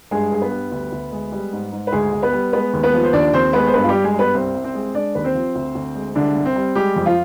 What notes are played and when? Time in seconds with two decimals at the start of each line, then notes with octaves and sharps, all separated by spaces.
0.11 G2 G#3 G#4
0.31 G2 G#4
0.41 B3 B4
0.51 G3
0.72 D2
0.92 D2
1.12 G#3
1.32 G3
1.53 G#2
1.72 G#2
1.87 B4
1.92 D2 G#3 G#4
2.13 D2
2.22 B3 B4
2.33 G3
2.53 G#3 B3 B4
2.73 D#2
2.83 B3 B4
2.93 F3
3.04 C5
3.13 D#2 D4 D5
3.33 D#2 C4 C5
3.53 G#3 B3 B4
3.67 C5
3.73 G2 B3 B4
3.83 F4
3.89 G3 G4
3.94 G2
4.04 G#3 G#4
4.14 G3 B3 B4
4.34 C2 C4 C5
4.54 C2
4.64 C4 C5
4.74 G#3
4.94 G#3 D4 D5
5.15 D#2 B4
5.24 C4 C5
5.35 F3
5.55 D2
5.75 D2
5.95 G#3
6.15 C2 D3 D4
6.35 C2
6.45 C4
6.56 G3
6.75 G3 G#3 G4
6.96 F2
7.06 F3 F4